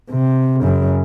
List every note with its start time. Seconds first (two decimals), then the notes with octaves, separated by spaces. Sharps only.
0.11 C3
0.62 F#2 C#3